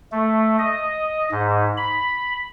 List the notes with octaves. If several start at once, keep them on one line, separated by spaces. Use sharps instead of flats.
A3
D#5
G#2
B5